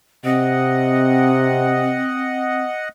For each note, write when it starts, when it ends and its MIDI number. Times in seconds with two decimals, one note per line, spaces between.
0.25 2.02 48
0.25 2.64 60
0.25 2.89 75
0.25 2.89 78